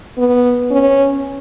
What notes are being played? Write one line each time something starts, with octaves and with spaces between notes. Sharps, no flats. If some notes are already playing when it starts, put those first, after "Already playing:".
B3
C#4